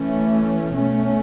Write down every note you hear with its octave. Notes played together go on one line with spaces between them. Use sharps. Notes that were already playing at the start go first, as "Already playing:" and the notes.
Already playing: E3 A3 C#4
B2 A3 C#4